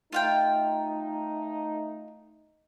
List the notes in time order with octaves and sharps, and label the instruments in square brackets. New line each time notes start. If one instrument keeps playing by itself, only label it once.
[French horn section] A3 D#4 [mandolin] F4 F5 G5